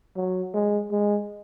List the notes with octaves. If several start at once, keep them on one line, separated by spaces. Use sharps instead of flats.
F#3
G#3
G#3